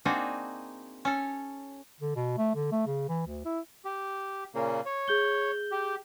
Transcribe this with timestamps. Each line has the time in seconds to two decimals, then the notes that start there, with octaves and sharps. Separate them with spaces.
0.05 A#3 C4 D4 D#4 F#4 G#4
1.05 C#4 A4
2.01 D3
2.16 B2
2.37 A3
2.55 D3
2.72 A3
2.87 C#3
3.09 E3
3.26 D2
3.45 E4
3.85 G4
4.55 A#2 C#3 A#3
4.86 C#5
5.08 G#4 G6 G7
5.71 G4